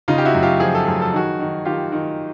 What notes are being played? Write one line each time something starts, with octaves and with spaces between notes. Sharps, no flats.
C#3 D#4 F4
G4
E4 F#4
F#2
F4 G4
F3 G#4
A4
F#2 G#4
A4
D#3 F#4 G#4
D#3
D#3 F4 G4
D#3